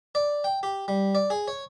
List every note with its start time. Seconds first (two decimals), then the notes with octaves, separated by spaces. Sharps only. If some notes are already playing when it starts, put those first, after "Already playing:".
0.15 D5
0.44 G5
0.63 G4
0.88 G3
1.15 D5
1.30 G#4
1.48 C#5